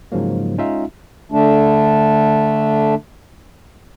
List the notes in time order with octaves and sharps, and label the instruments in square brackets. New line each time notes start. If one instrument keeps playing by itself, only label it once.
[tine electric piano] G#2 C#3 F3 F#3 A#3
G#3 C#4 D#4 F4 E5 F5
[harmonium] D3 A3 D4